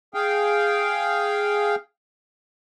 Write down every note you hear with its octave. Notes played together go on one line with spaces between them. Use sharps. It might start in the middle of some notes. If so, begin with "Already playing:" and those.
G#4 F5 G5